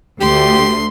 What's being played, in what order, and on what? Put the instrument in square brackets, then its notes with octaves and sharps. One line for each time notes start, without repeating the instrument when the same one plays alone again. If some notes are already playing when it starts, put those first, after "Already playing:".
[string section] D2 [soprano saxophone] G4 [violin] C6